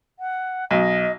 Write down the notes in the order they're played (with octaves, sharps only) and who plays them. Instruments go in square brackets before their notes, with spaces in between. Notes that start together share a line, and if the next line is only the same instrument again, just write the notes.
[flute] F#5
[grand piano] B1 [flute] D#5